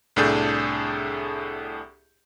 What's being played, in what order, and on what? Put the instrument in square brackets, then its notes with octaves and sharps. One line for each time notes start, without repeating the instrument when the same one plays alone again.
[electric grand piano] C2 A2 D4 G#4 A4 G6